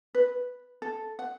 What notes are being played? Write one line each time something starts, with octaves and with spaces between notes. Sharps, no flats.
B4
A4
F#5